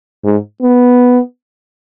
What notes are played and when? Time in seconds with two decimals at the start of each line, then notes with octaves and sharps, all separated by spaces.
0.24 G#2
0.62 B3